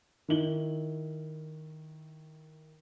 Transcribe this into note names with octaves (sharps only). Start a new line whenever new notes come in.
D#3 E4 F#7 G7